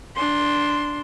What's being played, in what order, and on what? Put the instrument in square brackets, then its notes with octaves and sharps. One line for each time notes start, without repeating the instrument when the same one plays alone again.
[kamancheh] D4 C6